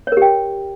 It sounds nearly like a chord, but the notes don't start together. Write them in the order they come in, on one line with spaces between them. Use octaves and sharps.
C#5 A#4 G4 G5